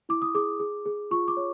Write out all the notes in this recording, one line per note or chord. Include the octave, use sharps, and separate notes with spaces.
E4 D6
D#6
G#4 D6
G#4
G#4
F4 C#6
D6
C#5